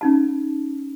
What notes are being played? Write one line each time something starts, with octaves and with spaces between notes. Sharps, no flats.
C#4 D#4 A5